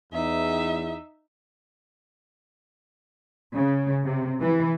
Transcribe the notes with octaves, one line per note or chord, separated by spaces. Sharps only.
E2 D#4 E5
C#3
C3
E3